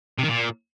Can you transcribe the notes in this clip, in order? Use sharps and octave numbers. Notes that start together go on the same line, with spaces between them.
C3
D#3
A#2